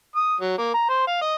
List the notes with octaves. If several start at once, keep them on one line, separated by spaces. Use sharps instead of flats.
D#6
F#3
A#3
A#5
C5
F5
D#5